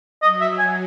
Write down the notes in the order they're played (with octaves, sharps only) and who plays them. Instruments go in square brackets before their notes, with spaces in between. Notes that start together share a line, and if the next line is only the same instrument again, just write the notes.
[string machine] F#3 [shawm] D#5
[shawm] E5
G#5